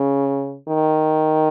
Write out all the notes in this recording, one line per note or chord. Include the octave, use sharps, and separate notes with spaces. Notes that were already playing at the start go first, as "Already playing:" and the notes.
Already playing: C#3
D#3